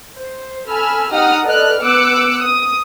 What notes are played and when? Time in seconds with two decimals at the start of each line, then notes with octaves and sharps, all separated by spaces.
0.18 C5
0.69 A4 G#5 B5 E6 F6
1.11 D#4 G4 F#5 A#5 D#6 F6
1.45 A4 B4 D5 D#5 F6 F#6
1.81 B3 D6 E6 F#6 C#7
2.42 D#6